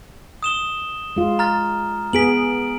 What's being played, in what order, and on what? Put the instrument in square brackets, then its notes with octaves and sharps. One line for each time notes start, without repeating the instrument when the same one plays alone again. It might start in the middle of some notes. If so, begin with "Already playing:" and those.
[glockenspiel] D#6 E7 G7
[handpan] G#3 F4
[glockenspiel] A#5 F6 A6
[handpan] B3 G#4 [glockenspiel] B6 D7 F#7